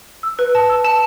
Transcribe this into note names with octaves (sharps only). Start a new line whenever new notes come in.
E6
B4
A5
E6
A5